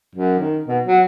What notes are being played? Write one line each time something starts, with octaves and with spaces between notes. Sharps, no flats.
F#2
D#3
B2
F#3